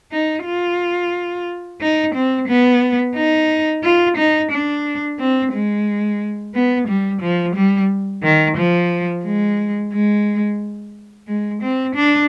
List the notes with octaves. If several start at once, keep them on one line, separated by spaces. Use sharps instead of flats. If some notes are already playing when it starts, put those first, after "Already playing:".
D#4
F4
D#4
C4
B3
D#4
F4
D#4
D4
C4
G#3
B3
G3
F3
G3
D#3
F3
G#3
G#3
G#3
C4
D4